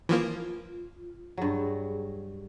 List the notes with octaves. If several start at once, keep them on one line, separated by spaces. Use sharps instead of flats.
E3 F3 A#3 F4
G2 F#3 G#4